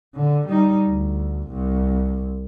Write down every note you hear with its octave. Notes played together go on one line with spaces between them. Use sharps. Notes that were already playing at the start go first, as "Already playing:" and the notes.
D3
G3 D#4
D2
C2